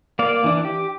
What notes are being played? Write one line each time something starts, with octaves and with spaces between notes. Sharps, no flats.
A#3 D5 F5
E3 D4
G4